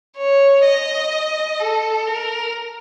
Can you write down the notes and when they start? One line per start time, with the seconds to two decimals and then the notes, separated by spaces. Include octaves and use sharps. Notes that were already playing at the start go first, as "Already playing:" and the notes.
0.17 C#5
0.64 D#5
1.60 A4
2.07 A#4